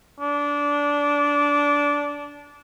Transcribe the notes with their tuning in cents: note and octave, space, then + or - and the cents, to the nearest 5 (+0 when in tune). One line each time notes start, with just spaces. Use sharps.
D4 -20